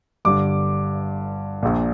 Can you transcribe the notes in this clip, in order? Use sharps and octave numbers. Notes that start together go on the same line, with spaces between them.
G1 G2 D3 D6
A#1 A#2